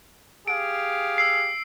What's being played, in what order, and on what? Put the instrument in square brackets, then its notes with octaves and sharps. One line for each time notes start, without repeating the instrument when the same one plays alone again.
[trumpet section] G4 G#4 F5 [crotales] D7
[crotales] E6 C7